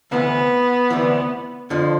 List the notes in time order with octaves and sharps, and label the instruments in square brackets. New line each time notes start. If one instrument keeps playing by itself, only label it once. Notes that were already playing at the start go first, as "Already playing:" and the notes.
[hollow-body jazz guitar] D2 C3 E3 [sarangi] B3
[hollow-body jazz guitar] D2 C3 E3
F2 D3 F3